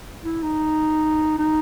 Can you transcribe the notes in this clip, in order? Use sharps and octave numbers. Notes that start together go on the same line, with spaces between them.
E4
D#4
D#4